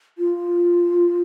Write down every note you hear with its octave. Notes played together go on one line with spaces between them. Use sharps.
F4